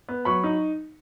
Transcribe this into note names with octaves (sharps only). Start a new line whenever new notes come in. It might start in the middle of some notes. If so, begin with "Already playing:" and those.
B3
F#3 B5 C#6
D#4